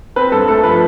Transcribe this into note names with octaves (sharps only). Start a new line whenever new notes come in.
C4 B4
G2 A4
A3 A4
F3 B4